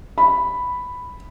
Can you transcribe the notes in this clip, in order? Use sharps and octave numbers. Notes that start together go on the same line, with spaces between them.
B5